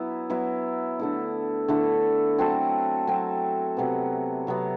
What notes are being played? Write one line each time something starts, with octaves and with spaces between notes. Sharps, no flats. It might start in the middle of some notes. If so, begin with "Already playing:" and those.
Already playing: F#3 B3 E4
F#3 B3 E4
D3 A3 E4
D3 A3 E4
F#3 C4 F#4 A4
F#3 C4 F#4 A4
C3 F#3 B3
C3 F#3 B3